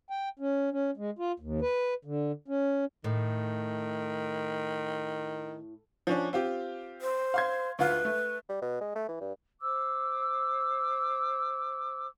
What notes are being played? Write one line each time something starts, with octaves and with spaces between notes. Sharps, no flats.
G5
C#4
C#4
G#3
F4
D#2
B4
D3
C#4
A2 D#3
F3 C#4 D4
C4 F4 G4
C5
F5 C6 G#6
D2 F4 B4 F5
A3
G3
B2
G#3
A3
E3
G2
C5 D6 E6